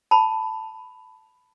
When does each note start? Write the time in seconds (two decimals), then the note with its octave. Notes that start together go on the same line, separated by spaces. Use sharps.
0.11 A5 B5